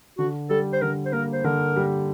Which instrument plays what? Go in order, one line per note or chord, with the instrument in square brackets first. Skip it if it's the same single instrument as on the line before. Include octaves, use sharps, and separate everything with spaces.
[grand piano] D3 [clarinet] F#4
[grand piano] G3 [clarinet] A4
[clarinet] C5
[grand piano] D3 [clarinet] A#4
[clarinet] C5
[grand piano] A#3 [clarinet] A#4
[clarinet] C5
[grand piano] D3 [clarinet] A#4
[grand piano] G3